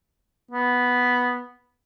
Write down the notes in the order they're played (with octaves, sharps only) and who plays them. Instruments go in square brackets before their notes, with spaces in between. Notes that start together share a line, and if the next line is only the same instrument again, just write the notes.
[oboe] B3